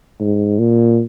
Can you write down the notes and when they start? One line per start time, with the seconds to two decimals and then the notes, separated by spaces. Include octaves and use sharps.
0.20 G#2
0.59 A#2